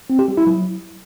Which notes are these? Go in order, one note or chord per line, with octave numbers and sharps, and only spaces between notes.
C4
G4
G3
E4
F#3